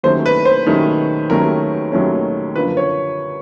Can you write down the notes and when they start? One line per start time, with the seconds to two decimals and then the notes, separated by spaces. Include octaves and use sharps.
0.03 D#2 D#3 F#3 A3 C#4 C5
0.26 B4
0.45 C5
0.66 D#2 D#3 F#3 A3 C#4
1.30 D#2 D#3 F#3 A3 C#4 A#4
1.92 D#2 D#3 F#3 A3 C#4
2.55 F#2 D3 F3 A#3 B4
2.77 C#5